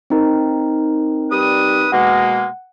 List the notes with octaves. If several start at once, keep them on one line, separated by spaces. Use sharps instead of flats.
C4 D#4 A#4
G3 B4 D#6
B2 G#3 A#3 F#5